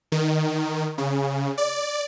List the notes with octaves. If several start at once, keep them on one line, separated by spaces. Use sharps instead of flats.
D#3
C#3
D5